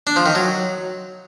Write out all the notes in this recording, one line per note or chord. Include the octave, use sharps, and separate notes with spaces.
D4
F3
D#3
F#3